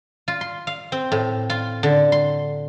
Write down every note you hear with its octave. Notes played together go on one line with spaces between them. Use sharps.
F4
C6
F5
C4
A2
F4
D3
C6